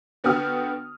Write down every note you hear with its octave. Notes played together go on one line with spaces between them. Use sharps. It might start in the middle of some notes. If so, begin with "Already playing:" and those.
D3 B3 F#4 G5 D#6 F6